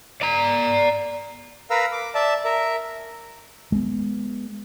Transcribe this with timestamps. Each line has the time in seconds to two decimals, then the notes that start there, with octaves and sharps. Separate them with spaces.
0.22 D5 A#5
1.70 A#4 B4 F5 A#5 E6
1.92 D6
2.15 D5 E5 A5
2.45 A#4 E5
3.72 G#3 B3